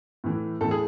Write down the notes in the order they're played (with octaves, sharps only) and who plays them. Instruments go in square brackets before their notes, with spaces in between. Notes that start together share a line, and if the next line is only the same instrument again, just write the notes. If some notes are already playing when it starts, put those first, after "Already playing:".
[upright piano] A2 E3
A2 E3 A4
G#4